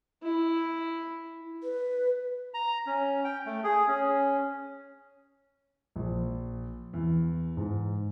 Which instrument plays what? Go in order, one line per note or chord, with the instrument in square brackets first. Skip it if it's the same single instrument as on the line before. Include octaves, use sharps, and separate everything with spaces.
[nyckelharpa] E4
[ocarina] B4
[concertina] A#5
C#4
G5
A3
G#4
C#4
[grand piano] A#1
E2
G#2